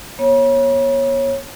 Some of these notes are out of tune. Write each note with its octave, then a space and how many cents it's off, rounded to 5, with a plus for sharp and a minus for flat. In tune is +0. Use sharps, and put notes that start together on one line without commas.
B3 -45 C#5 -20